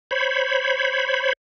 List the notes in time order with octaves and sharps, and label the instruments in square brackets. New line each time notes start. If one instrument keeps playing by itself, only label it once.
[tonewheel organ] C5 C#5 B5